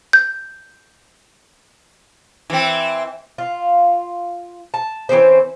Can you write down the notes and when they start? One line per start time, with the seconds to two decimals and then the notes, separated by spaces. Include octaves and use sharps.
0.13 G6
2.50 E3 C4
3.38 F4
4.74 A5
5.09 E3 C4 C#4 C5